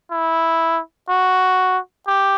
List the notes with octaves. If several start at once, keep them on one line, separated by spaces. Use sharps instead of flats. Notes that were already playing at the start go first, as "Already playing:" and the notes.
E4
F#4
G4